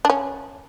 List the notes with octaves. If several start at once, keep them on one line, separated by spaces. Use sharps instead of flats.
D4
C#4